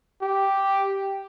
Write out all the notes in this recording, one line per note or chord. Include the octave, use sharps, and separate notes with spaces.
G4